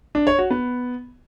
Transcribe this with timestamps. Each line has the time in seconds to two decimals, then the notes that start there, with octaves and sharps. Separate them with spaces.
0.15 D4
0.27 C#5
0.39 F#4
0.50 B3